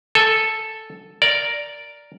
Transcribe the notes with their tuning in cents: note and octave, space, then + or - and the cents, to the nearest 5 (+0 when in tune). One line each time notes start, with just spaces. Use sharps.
A4 +0 G#5 +0
A#4 +0 D5 -5